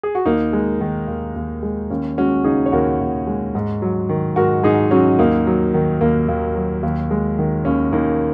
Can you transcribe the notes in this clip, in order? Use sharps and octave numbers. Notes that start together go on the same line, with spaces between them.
G#4
F#4
D#2 A#3 D#4
G#3
D#3
D#2
D#2
G#3
D#2 C#4
G#3 C#4 F#4
C#3 D#4 G#4
C#5
D#2 F#4 A#4
D#2
G#3
G#2
F#3
D#3
G#2 F#4 A#4
G#2 D#4 G#4
F#3 C#4 F#4
D#2 A#3 D#4
F#3
D#3
D#2 A#3
D#2
F#3
D#2
G#3
D#3
D#2 C#4
D#2 A#3 D#4